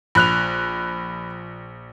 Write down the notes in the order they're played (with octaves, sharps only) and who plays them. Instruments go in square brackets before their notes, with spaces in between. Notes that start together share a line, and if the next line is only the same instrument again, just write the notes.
[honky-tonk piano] A#1 [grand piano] B5 F#6 F7